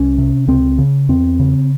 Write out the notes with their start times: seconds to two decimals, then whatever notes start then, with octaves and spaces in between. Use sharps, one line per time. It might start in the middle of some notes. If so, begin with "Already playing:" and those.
Already playing: C2 C#4
0.18 C3
0.48 C#2 C4
0.78 C#3
1.09 E2 C4
1.39 C#3